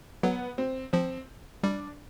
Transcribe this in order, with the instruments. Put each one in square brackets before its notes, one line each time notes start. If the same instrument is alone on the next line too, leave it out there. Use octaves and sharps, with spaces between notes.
[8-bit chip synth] F#3 [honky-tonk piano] B3
[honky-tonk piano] C4
[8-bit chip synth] F3 [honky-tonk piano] C4
[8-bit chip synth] G3 [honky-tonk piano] D4